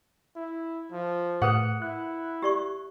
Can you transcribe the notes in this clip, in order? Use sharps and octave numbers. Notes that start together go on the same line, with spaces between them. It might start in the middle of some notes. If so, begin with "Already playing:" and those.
E4
F3
A2 G#4 A#4 B4 F#5 D#6 F#6
E4 F#6
G4 D5 C#6